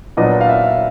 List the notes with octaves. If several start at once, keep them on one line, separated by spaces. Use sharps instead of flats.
A#2 F#3 B3 D4 D#5
F5
E5